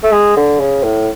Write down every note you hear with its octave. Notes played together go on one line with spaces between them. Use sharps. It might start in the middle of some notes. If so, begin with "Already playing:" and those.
A3
G#3
D3
C#3
A2